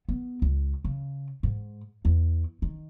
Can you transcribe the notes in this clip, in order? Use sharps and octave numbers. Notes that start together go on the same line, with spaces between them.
B3
C#2
C#3
G#2
E2
D#3